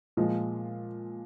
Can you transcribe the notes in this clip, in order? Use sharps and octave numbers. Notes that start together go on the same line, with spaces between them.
A#2 F3 G#3 F4